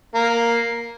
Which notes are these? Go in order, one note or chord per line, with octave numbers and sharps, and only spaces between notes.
A#3